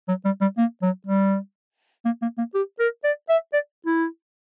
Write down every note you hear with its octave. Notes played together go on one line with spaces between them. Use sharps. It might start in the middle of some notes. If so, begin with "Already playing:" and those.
F#3
G3
G3
A#3
F#3
G3
A#3
A#3
A#3
G4
A#4
D5
E5
D5
E4